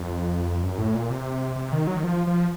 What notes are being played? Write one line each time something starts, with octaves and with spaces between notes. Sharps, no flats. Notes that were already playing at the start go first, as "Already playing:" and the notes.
Already playing: F2
F#2
A2
A#2
C3
C3
D#3
F#3
D#3
F3
F3